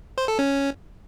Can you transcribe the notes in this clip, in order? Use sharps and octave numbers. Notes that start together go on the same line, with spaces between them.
C5
A4
C#4